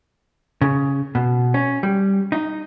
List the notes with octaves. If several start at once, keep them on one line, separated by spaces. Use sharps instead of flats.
C#3
B2
C#4
G3
D#4